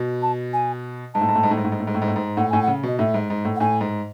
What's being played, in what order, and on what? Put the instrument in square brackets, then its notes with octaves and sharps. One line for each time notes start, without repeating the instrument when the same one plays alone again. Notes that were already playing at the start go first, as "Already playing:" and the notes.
Already playing: [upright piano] B2
[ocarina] A5
G#5
[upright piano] G#2 [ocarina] A5
[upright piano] A2
G#2
A2
G#2
A2
G#2
A2
G#2
A2
G#2
A2
G#2
A2
G#2
[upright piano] A2 [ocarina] F#5
[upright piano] A2 [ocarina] G#5
[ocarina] F#5
[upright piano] C#3
[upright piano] B2 [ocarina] D#5
[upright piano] A2 [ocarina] E5
[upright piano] G#2
G#2
A2
[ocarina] F#5
[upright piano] A2 [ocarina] G#5
[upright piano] G#2